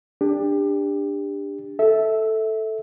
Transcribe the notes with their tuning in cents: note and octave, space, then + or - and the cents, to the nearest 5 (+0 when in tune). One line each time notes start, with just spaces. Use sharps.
D4 +0 G4 +30
A4 +0 E5 -20